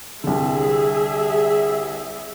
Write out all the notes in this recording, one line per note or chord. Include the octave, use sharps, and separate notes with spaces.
C2 D3 G3 G#4 E5